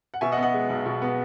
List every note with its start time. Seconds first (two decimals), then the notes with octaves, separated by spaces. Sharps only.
0.14 F#5
0.21 B2 E5 G#5
0.32 D#5 F#5
0.37 B3
0.43 D#5 F#5
0.53 G#3
0.70 B1
0.86 B2
1.02 B3